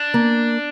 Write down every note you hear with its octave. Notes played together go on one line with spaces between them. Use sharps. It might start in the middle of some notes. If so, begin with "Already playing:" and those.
Already playing: D4
A#3